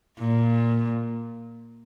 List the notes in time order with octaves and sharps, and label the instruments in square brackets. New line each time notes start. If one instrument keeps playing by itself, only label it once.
[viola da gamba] A#2